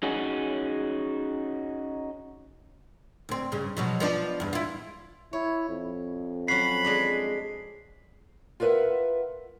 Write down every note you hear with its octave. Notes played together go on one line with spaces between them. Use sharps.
C#4 D#4 F#4 G#4
D2 C4
G2 C#3
B2 F3 F#3
F3 B3 D4
E2 G2
E4 F4
E4 C#5
F2
F#3 C#4 F#5 B5 C7
G#3 D4 D#5
F4 A#4 B4 C#5 E5 F#5